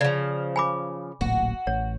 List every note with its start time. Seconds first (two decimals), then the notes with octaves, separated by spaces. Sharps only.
0.01 C#3 F3 D5
0.56 G#5 B5 D6
1.21 D1 A1 A#2 F#4
1.67 A1 C#5